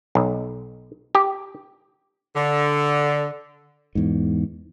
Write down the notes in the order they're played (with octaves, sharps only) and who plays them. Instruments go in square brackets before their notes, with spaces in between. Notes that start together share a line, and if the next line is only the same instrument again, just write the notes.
[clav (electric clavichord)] B1
G4
[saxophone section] D3
[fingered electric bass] E2 G#2